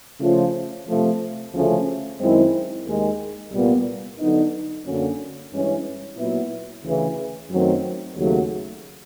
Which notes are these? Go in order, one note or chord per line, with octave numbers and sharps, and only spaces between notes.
C#3 F3 A3 C#4 F4
C3 F3 A3
D2 C#3 F3 A3 C#4
F#2 D#3 G#3 C4 E4
D#2 D#3 G#3
C2 A#2 G3 B3
D3 F#3 B3 D#4
F#2 D3 F#3 A#3 C#4
G2 E3 G#3 C#4
A#2 F#3 B3 E4
D2 C#3 E3
F#2 D#3 F#3 A3 C4
D#2 C#3 F#3 A3